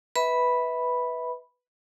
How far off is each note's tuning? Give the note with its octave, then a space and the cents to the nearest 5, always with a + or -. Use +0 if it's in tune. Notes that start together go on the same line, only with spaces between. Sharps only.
B4 +0 E5 -30 B5 -5